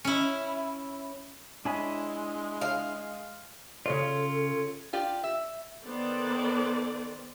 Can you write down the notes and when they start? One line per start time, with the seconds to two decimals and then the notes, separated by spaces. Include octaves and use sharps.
0.05 C#4 E4
1.65 G#3 D4 E4 C#5 E5 G#5 B5
2.61 F5
3.86 C#3 C#4 F4 A4 C#5 D5
4.93 F4 G4 D5
5.24 E5
5.86 D#3 B3 A4 C5 D5